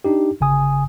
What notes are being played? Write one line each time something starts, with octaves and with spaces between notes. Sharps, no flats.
D4 D#4 G4
G1 C#3 G#5 D#6